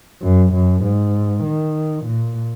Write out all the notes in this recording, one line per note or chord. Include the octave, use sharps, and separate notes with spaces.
F#2
F#2
G#2
D#3
A#2